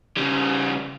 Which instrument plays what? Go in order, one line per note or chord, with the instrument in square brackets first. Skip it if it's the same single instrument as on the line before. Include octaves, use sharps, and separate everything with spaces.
[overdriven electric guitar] C#3 G3